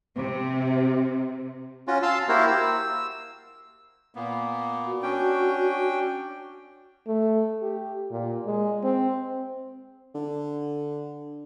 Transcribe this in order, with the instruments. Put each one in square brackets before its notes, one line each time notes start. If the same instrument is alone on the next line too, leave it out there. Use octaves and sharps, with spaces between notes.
[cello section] C3
[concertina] C#4 F4 F#4
F5 A5 C6 E6
A#3 E4 F#4 G4 A#4 C5
E6
[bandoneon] A#2 A#3 B3
[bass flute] F#4
[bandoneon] C#4 D4 G5
[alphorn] A3
G4
A#2
G#3
C4
[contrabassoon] D3